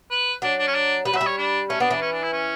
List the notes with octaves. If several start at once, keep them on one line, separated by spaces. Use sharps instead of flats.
B4
F#3 D4
D4
C#4
D4
G3 B4
F#3 E5
G3
C#5
D4
A3 C#4
B3 D4
E3 D4
C#4
D4
E4
C#4